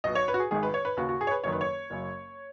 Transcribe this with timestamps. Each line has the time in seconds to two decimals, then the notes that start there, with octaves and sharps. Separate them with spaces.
0.04 B1 B2 D#5
0.15 C#5
0.28 B4
0.34 F#4
0.40 G#4
0.51 G#1 G#2 D#3 G#4
0.63 B4
0.74 C#5
0.85 B4
0.97 D#2 C#3 F#4
1.09 F#4
1.21 G#4
1.27 C#5
1.31 B4
1.44 F#1 F#2 D#3 C#5
1.52 B4
1.61 C#5
1.90 F#1 F#2 C#3